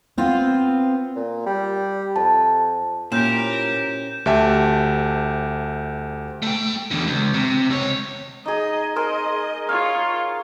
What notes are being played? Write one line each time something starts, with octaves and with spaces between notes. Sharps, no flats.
B3 C4 F4
A#2
G3
F2 A5
A#2 C#4 E4 G4 A#4 C5 G6 E7
D2 G4 E5 G5 A5
A3 G5
E2 D3
C#2
C3
C#2 C#5
D#4 G#4 D#5
G#4 A#4 C5 D#5
F4 C#5 F5